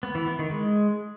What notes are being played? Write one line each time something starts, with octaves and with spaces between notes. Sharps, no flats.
B3
E3
B3
D#3
G#3